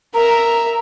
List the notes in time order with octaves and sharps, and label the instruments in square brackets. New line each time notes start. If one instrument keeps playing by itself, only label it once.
[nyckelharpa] A#4 E5 [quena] A#5